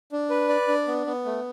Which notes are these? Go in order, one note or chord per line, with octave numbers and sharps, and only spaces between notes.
D4
B4
D5
D4
B3
B3
A3